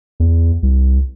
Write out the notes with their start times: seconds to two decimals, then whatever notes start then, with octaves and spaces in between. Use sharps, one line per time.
0.20 E2
0.63 C2